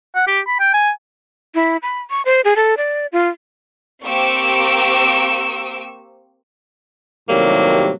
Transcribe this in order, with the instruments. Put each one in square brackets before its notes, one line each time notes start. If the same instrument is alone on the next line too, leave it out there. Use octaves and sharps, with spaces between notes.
[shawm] F#5
G4
B5
G5
G#5
[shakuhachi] E4
B5
C#6
C5
G#4
A4
D5
F4
[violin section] A#3 C4 G4 C#6 E6 D7
[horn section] A2 C3 D#3 F#3 G3 A#3